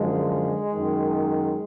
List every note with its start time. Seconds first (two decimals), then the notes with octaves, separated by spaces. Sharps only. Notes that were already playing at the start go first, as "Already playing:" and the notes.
Already playing: F#2 D3 F3 G#3
0.74 F#2 D#3